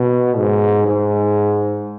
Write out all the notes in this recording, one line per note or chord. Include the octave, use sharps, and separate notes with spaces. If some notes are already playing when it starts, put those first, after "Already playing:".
Already playing: B2
G#2
G#2